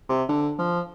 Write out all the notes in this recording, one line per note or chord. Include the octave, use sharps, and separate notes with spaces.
C3
D3
F3